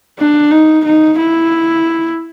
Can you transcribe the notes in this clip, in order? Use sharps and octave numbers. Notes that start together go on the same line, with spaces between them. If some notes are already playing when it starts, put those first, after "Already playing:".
D4
D#4
D#4
E4